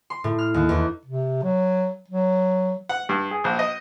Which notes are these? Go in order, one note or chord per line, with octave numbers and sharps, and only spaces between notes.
C6
A2
F6
D#2
E2
C3
F#3
F#3
F#5
G2
G#4
A#1
D#5